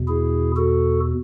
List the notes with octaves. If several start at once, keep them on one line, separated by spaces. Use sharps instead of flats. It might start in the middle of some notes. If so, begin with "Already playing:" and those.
Already playing: E2 B2
E4 G#4
F#4 A4